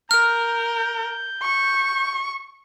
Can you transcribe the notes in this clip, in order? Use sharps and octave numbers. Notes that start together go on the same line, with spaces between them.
A#4 F6 G6
C#6